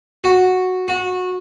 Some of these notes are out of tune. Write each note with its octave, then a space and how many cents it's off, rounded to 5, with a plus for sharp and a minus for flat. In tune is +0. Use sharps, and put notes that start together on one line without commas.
F#4 -5
F#4 -20